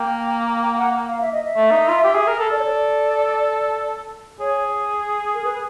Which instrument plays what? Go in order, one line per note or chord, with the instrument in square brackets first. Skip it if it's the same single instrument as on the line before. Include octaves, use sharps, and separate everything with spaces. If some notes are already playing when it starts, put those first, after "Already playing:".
Already playing: [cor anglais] A#3 [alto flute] G5
[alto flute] G5
F#5
F5
E5
D#5
E5
[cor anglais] A3
D#4
F4
G4
G#4
A#4
A4
[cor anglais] A4 [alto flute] D5
[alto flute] C#5
D5
[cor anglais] G#4 [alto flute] C#5
[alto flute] A#4
B4